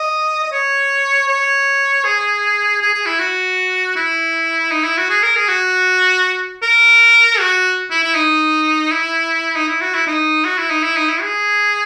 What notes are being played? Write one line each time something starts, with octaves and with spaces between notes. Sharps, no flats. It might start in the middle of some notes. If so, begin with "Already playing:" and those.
Already playing: D#5
D#5
C#5
C#5
G#4
G#4
G#4
E4
F#4
E4
D#4
E4
F#4
G#4
A#4
G#4
F#4
A#4
F#4
E4
E4
D#4
E4
D#4
E4
F#4
E4
D#4
F#4
E4
D#4
E4
D#4
E4
G#4